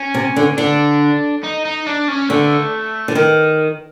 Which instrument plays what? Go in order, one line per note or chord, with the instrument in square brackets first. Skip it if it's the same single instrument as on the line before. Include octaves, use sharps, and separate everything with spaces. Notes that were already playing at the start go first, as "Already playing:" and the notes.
Already playing: [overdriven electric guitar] C#4
[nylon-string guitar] C3
D3
[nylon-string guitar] D3 [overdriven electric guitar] D4
[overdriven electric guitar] D#4
D#4
D4
C#4
[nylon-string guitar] D3 [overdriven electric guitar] A3
[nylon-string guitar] D3
D#3